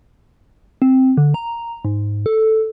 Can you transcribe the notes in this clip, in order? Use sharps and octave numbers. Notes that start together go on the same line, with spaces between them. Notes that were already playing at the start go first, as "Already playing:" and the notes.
C4
D3
A#5
G#2
A4